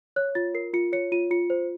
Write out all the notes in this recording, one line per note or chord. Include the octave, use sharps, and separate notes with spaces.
C#5 F#6
F4 A6
A#4 C7
F4 C#7
C#5 C#7
F4 D#7
F4 C#7
C5